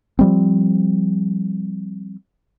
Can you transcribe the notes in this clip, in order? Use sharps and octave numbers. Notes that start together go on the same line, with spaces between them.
F3 G3 C4